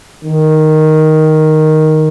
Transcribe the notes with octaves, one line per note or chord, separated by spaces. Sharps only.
D#3